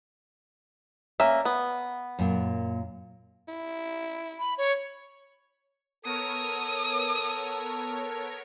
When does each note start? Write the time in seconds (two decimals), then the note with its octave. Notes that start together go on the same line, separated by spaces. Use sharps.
1.20 A#3 C#4 D5 E5
1.45 B3
2.19 F#2 A#2
3.48 E4
4.39 B5
4.58 C#5
6.05 B3 A4 A#4 C#5 D#6